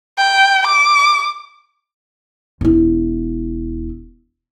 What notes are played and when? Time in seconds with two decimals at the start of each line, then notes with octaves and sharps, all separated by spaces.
0.17 G5
0.67 D6
2.61 E1 E4